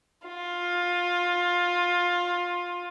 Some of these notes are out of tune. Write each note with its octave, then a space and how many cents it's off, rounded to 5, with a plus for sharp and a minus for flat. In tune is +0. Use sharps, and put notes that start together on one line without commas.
F4 +15